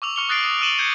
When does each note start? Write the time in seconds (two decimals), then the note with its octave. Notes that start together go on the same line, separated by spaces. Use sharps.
0.02 C#6 D6 E6 F7
0.16 C#6 F6 C#7 F7 G7
0.29 D#6 F#6 A6 A#6 C7 D7
0.44 D#6
0.61 E6 D#7 E7 F#7 G7
0.78 G6 G#6 C#7 D#7 E7